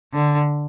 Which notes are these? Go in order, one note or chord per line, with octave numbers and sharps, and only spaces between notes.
D3